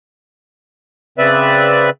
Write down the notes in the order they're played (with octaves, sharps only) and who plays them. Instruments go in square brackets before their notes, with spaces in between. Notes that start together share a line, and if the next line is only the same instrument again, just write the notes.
[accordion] C#3 C4 B4 D5 E5